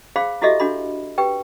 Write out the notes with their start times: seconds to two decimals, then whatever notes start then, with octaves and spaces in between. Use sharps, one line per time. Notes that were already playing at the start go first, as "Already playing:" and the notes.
0.16 G#4 C5 F5 B5
0.42 E4 F#4 G4 A4 D#5 E5
0.60 D4 F#4 A4 B5
1.18 G4 B4 G5